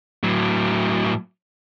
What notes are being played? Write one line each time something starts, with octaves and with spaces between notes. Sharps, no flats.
A2 F#3